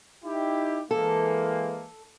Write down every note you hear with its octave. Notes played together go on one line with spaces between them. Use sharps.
D#4 E4 G4
E3 G#3 A#3 A4